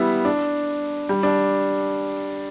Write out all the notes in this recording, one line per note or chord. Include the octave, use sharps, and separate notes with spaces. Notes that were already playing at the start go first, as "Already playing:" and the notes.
Already playing: G3 B3 E4
D4
G3
D4